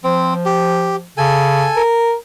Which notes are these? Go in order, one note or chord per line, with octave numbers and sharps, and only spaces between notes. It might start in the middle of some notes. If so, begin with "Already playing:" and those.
F3 C4
G4
C#3 A4 G#5
A#4